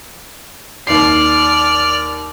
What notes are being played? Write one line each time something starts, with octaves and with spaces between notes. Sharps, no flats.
D#2 D5 F6 C7